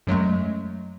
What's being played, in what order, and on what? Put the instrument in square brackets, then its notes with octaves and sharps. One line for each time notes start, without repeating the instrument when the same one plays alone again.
[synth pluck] F#2 F#3 G#3 A3